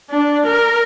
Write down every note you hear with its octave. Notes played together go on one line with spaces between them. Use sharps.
D4
A#4